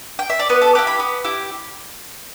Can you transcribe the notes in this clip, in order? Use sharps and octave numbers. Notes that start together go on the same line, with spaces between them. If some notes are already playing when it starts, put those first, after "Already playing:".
G5
E5
D5
B3 B4
A4
E4 G4 B4
B5
B3
E4 G4